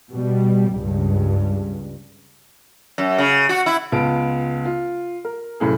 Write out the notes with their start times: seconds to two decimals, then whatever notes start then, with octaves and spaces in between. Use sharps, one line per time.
0.12 B2 G3
0.74 C#2 G2
2.98 F#2
3.18 C#3
3.49 F#4
3.66 E4
3.92 C#2 B3 F4 A5 D7
4.65 F4
5.25 A#4
5.60 F1 F#2 A2 G#4